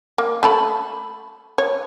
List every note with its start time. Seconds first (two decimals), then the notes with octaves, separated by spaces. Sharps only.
0.18 A#3
0.43 A3 A4 B5
1.58 C#5